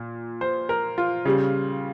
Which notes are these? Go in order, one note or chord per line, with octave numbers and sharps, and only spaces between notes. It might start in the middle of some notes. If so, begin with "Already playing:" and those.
Already playing: A#2
C5
A#4
F4
C#3 G3